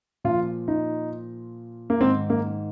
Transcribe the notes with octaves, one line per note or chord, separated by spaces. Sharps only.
A#2 F3 F4
D#4
A#3
G#2 D#3 C4
A#3